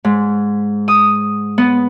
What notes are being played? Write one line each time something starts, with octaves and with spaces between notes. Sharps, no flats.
G#2
D#6
B3